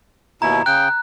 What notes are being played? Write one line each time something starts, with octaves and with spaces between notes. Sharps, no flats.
D#2 B2 E4 A#5
C#3 G5 F#6